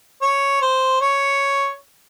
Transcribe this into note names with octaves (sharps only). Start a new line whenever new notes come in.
C#5
C5
C#5